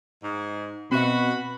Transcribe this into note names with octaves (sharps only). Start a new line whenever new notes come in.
G#2
B2 C4 F#4 E5 B5